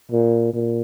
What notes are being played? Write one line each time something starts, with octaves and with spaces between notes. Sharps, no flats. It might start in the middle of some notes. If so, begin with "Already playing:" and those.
A#2
A#2